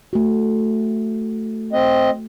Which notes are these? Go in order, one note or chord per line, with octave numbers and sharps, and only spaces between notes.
A3 F#4
C4 D#5